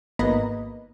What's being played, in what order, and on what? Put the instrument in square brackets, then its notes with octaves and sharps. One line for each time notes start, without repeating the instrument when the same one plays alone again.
[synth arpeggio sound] G#1 A#3 B3 D#5 A#5 B5